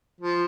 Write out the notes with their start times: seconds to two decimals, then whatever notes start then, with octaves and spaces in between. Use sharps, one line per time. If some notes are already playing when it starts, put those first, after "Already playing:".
0.21 F3